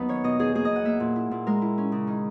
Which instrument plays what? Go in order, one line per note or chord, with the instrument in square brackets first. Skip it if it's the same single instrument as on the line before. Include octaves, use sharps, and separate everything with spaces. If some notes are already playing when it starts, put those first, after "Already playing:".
Already playing: [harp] D#2 F#3 B3 D#4 B4
D#3 C#5
B2 D#5
E2 G#4
A#3 G#4
D#5
E2
F#5
A#3 E5
A#2
E4
A#2
G#3 A#4
E4
C#4
C#3
D#3